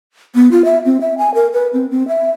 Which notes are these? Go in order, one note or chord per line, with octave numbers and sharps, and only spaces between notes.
B3
F4
E5
C4
E5
G#5
A#4
B4
C4
C4
E5